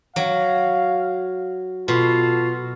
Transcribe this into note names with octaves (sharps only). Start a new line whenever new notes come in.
F#3 F5
B2 F4 A4